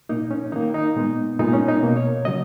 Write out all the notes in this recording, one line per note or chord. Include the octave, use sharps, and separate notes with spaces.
A#2 A#3 D#4
C#4
D#3 A#3 D#4
D#4
A#2 G#3 B3
A#2 G#3 B3 D#4
C#4
D#4
B2 A#3
C#5
C#3 F#3 D#5